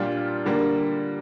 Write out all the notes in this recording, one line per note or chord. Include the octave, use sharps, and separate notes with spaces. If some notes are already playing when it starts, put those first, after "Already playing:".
Already playing: A#2 G3 D4 F4
D3 G3 A#3